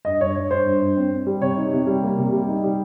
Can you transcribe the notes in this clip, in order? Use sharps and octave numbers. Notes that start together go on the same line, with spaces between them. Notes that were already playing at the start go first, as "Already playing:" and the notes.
G2 D#5
G2 C#5
G2 C#5
G2 C5
G2
G2
C4
C4
G3
C3 C#5
D#4
C3
G3
A#3
C3
G3
D#4
G3